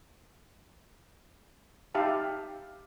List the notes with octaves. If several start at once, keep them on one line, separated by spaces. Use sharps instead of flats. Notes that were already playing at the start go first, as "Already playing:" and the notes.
D#4 G4 E5 F5 A5